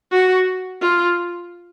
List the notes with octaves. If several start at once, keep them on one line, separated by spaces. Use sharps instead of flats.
F#4
F4